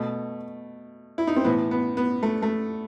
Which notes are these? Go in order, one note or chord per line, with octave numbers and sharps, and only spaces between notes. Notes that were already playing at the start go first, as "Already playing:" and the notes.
Already playing: B2 A3
E4
D#4
C4
A2 E3 B3
B3
B3
A3
A3